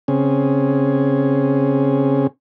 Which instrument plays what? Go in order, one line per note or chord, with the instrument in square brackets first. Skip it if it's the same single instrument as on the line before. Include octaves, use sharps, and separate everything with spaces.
[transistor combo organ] C#3 C4 C#4 G#4